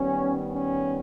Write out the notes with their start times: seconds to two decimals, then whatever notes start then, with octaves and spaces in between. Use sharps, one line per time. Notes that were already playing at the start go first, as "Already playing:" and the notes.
Already playing: D#3 G3 B3 C#4
0.54 C#4